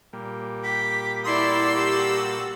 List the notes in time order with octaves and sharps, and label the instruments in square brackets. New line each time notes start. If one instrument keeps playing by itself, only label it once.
[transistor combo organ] A#2 G3
[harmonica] G4 [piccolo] B6
[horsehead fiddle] E4 D5 [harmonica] F#4 A4 E6 [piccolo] C6
[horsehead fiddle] G4